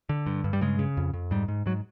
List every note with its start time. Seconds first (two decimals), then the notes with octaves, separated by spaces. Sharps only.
0.09 D3
0.26 G2
0.44 G2
0.53 G3
0.61 C#3 G#3
0.79 C#3
0.97 F2
1.13 F2
1.31 G#2 G3
1.48 G#2
1.66 G#2 F#3